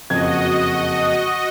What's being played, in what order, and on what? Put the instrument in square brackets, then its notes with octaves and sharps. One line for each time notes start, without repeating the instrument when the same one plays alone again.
[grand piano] F#1 F2 G#6 [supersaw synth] F#4 D#5